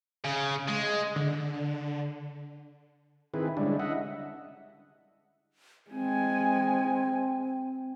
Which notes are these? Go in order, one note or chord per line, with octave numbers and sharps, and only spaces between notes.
C#3
G#3
D3
D#3 C4 E4 G#4 B4
D3 G3 G#3 C#4 D4 E4
D#5 E5 F#5
G#3 C4 G#5